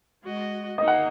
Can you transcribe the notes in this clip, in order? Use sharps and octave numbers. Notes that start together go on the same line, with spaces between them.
G#3 F#4 D#5
A#3 D#4 D#5
F#5